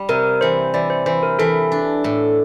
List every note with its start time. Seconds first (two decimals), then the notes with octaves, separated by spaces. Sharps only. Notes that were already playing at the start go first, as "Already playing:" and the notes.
Already playing: G3
0.09 C3 A#4
0.41 E3 C5
0.74 E3 D5
0.90 C5
1.06 E3 C5
1.23 A#4
1.39 E3 A4
1.72 D4
2.04 A2